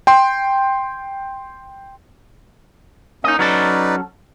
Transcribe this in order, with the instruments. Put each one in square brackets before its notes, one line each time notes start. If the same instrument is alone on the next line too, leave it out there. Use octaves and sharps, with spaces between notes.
[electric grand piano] G5 C6
[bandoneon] A#3 C#4 [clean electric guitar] D#4 D#5
[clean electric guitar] F#3 C#4 A4 [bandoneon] D#4 B4 D5